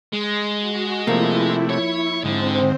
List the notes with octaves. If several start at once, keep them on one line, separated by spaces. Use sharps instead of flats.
G#3
F#4
C3 F3 A3 A#3 E4
C#5
G#2 D3 C4 C5